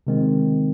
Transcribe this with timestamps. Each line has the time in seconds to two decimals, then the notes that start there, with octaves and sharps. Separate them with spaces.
0.07 C3 D#3 G#3 C4